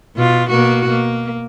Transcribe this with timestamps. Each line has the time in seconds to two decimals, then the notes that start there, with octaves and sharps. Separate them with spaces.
0.16 B2 F4
0.50 B2 A#3 F#4
0.90 A#3